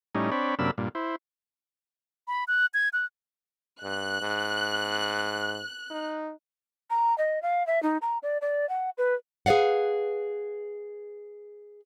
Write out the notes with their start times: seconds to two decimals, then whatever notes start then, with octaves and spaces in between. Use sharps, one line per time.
0.15 A2 G3 C#4 D#4
0.31 C4 D4 C#5 B5
0.59 F#2 C3 A#3 D4 B5 E6
0.78 G2 A#2
0.95 E4 C5
2.28 B5
2.48 F#6
2.74 G#6
2.93 F#6
3.83 G2 F#6
4.21 G#2
5.90 D#4
6.90 A#5
7.18 D#5
7.42 F5
7.67 E5
7.83 D#4
8.02 A#5
8.23 D5
8.41 D5
8.69 F#5
8.98 B4
9.46 G#4 B4 D5 F5 F#5